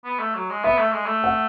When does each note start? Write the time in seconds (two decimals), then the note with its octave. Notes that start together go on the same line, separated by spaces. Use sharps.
0.05 B3
0.19 A3
0.35 F#3
0.50 G#3
0.64 B3 E5
0.79 A3
0.93 G#3
1.06 A3
1.24 F#5